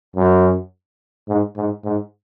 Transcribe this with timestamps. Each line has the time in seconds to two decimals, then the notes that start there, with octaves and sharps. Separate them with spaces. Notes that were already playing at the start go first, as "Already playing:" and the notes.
0.16 F#2
1.28 G#2
1.56 G#2
1.84 G#2